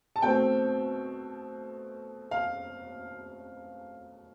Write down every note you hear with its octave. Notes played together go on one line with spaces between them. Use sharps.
A5
B2 A3 C4 G5
F5